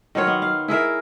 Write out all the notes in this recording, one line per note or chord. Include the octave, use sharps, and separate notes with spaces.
D#3 F#3 F4 C#5
B3
F5
E4 G#4 A#4 E5